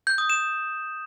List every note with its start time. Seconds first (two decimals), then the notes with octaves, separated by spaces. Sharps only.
0.07 G6
0.18 D#6
0.30 E7